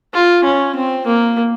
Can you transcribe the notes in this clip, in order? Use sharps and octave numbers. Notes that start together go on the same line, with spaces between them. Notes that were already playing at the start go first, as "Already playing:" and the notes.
F4
C#4
C4
A#3